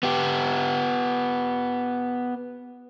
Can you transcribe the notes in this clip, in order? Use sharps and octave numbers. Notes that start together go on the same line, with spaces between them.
B3 G4